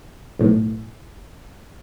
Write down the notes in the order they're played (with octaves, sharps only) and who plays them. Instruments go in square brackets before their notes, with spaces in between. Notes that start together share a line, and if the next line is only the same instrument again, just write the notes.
[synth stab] B1 A2